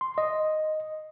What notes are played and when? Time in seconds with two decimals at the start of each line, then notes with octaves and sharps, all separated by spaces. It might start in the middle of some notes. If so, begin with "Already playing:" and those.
0.01 C6
0.18 D#5